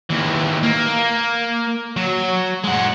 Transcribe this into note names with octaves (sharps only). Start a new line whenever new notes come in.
D#2 E3
A#3
F#3
G#3 F#5